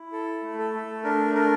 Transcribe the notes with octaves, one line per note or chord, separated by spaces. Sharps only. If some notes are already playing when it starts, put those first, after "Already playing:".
Already playing: E4
A4
A3
A4
A3
D4 A#4
D4 A#4